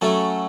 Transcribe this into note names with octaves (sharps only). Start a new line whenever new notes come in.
F#3 A3 C#4 A4